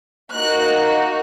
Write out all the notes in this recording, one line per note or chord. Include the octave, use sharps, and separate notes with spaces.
A#3 D#4 F#4 F#6